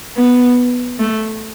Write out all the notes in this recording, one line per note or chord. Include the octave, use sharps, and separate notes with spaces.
B3
A3